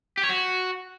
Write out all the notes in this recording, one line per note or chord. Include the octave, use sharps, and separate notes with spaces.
G4
C#5
F#4